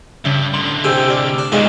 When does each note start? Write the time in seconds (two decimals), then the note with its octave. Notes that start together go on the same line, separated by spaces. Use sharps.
0.25 G2 C#3 C#4 E5
0.54 A2 D3 C6
0.84 C3 G#4 G5 E6 G6
1.08 G4 D5 F6
1.38 D4
1.52 B1 D#3 G#3 F4